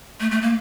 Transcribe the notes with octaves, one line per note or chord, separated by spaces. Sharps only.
A3
A3
A#3